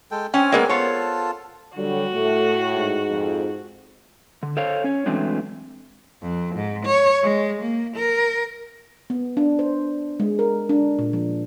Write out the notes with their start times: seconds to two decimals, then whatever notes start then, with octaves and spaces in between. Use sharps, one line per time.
0.11 G#3 A4 G5
0.34 C4 C#4 G5 G#5
0.52 G#3 A#3 B3 G#4 A#4 D5
0.69 B3 F4 A4 C5 C#5 A5
1.76 D3 F#3 G3 F#4
2.14 A2 A3
2.75 G#2
3.10 F2
4.43 D3
4.57 A4 C5 C#5 F5
4.84 C#4 C#5
5.06 E3 F#3 G#3 A3 C4 D4
6.22 F2
6.56 G#2
6.85 C#5
7.23 G#3
7.62 A#3
7.96 A#4
9.10 B3
9.37 D4
9.59 C5
10.20 G#3
10.39 A#4
10.69 D4
10.99 A#2
11.13 F3